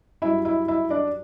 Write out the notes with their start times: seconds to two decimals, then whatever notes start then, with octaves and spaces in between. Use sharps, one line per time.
0.22 G2 F#3 C#4 E4 E5
0.45 E4 E5
0.68 E4 E5
0.90 D4 D5